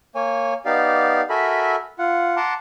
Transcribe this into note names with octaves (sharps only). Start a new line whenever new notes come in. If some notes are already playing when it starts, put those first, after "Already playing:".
A#3 C#5 G#5
B3 D#4 G4 D5 F5
F#4 A4 A#4 E5 G#5 B5
F4 F#5
F#5 A5 A#5 C6 D6